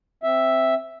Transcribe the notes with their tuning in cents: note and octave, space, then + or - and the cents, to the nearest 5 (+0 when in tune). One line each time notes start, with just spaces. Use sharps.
C4 +0 E5 +0